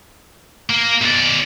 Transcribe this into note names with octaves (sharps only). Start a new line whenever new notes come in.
A#3
B1 D5